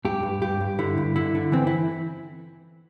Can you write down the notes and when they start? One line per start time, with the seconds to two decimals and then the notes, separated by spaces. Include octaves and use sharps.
0.05 G2 G4
0.23 G2
0.41 G2 G4
0.61 G2
0.79 D3 E4
0.98 G2
1.16 D3 E4
1.35 D3
1.52 E3 C4
1.67 E4